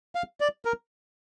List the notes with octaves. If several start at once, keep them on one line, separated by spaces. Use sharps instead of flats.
F5
D5
A#4